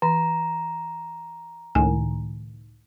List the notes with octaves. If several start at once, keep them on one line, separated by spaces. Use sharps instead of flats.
E3 A#5
C#2 A2 D#3 G#5